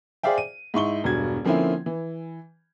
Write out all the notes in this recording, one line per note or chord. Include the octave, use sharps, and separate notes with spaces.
G#4 C5 D5 E5 F5 G5
D#7
G#2 E4 C#6 G7
E1 G2 F#4 G#6
D3 F3 A#3 C4 C#4 E4
E3